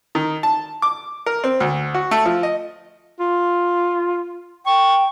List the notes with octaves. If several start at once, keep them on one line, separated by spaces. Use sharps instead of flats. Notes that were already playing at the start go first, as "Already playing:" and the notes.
D#3
A5
D6
A#4
C4
D2
F#4
A3
F3
D#5
F4
G5 C#6